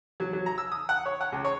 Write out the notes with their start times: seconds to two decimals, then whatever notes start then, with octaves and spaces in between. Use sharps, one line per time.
0.20 F#3
0.33 F#3
0.46 A#5
0.58 E6
0.71 D#6
0.89 F#5
1.06 C#5
1.21 F#5
1.32 C#2
1.45 C#5